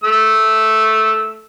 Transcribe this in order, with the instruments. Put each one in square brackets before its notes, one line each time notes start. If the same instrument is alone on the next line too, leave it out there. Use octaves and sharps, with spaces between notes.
[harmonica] A3 E6